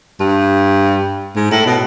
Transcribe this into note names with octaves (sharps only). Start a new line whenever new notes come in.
G2
G#2
A2
B2